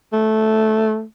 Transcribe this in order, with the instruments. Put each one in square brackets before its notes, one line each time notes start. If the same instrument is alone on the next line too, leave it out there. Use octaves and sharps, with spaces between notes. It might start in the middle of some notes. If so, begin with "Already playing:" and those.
[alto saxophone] A3